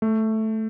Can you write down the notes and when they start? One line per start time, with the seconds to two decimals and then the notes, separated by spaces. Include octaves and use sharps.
0.02 A3